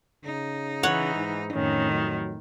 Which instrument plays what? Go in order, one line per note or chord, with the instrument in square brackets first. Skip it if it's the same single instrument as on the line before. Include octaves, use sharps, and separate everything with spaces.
[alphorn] C#3 [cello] D#4
[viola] E3 [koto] C#5 F#5
[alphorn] G#2
[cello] F2 A2 [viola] D#3 [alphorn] C#4
[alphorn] F#3